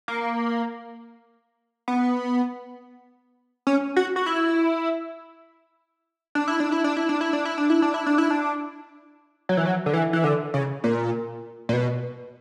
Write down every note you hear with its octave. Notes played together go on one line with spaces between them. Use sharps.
A#3
B3
C#4
F#4
F#4
E4
D4
E4
D4
E4
D4
E4
D4
E4
D4
E4
D4
E4
D4
E4
D4
E4
D4
F#3
E3
F#3
D3
E3
E3
D3
C#3
A#2
A#2
B2